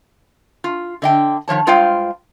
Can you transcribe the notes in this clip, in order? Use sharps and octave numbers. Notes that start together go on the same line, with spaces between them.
F4
D3 D#5 G5
D#3 F3 C#5 A5
G2 G#3 F4 C5 F5 G5